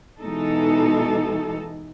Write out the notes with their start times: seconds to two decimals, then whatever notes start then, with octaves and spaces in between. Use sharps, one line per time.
0.20 B2 E3 G#3 D#4 A4